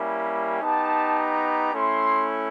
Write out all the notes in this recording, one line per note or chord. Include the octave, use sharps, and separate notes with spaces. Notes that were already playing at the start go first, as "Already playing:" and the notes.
Already playing: G3 A#3 C#4 E4 G4
B3 D#4 G4 A5
A#5
A3 C#4 E4 C6